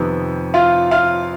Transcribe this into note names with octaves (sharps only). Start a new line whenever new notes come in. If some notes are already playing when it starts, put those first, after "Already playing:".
Already playing: F2 C3 D#3 B3
F4 F5
F4 F5